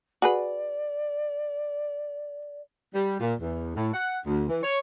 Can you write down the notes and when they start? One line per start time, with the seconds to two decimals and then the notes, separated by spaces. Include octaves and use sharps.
0.22 F#4 G#4 B4 D5
2.94 G3
3.20 A#2
3.40 E2
3.76 A2
3.94 F#5
4.26 D2
4.49 E3
4.63 C#5